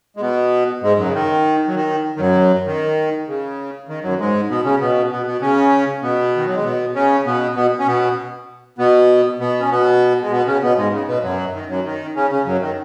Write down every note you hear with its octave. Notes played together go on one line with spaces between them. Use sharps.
G#3
B2 B3
G#2 G#3
F#2 F#3
C#3
D#3
F#3
D#3
D#3
F#2 F#3
D#3
C#3
D#3
F#2 F#3
G#2 G#3
B2 B3
C#3 C#4
B2 B3
B2 B3
B2 B3
C#3 C#4
B2 B3
D#3
F#3
G#3
B2 B3
C#3 C#4
B2 B3
B2 B3
C#4
B2 B3
B2 B3
B2 B3
C#4
B2 B3
G#3
B2 B3
C#3 C#4
B2 B3
G#2 G#3
C#3
B2 B3
F#2 F#3
D#3
F#2 F#3
D#3
C#3 C#4
C#3 C#4
F#2 F#3
D#3